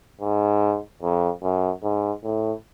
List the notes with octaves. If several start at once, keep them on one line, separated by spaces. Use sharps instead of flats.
G#2
F2
F#2
G#2
A2